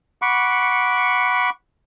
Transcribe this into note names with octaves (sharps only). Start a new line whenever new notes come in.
F#5 B5 C#6 D6